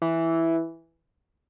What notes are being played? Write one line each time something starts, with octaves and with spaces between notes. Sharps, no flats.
E3